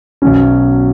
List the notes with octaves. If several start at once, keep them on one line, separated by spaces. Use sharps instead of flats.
B1 B2 F#3 C#4